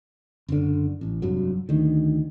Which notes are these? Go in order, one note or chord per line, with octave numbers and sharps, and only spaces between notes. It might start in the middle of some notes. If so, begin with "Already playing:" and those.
F#1 D3
A1
F1 G2 F#3
D2 D#3